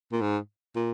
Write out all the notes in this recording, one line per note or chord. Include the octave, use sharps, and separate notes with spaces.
A#2
G#2
A#2